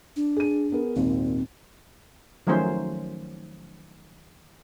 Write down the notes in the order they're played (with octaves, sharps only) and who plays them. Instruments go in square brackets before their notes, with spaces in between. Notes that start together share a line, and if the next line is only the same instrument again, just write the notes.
[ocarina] D4
[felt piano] G#4 D#7
B3 G#4 A#4
[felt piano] G#1 D#2 A#2 [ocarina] C4
[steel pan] D#3 F3 F#3 A3 C#4 C5